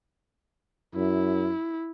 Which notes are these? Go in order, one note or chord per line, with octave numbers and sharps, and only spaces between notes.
F#2 E4